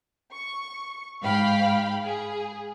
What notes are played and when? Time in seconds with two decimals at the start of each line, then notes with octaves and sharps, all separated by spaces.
0.33 C#6
1.22 G#2 F5 G5 B5
2.05 G#4